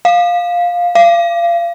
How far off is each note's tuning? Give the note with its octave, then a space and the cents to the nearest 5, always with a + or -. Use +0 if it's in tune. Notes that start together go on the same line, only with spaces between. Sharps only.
F5 +10
F5 -30